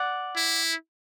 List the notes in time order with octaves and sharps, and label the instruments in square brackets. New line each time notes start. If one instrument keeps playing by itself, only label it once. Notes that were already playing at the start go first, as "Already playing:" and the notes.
Already playing: [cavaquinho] D5 F#5
[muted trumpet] E4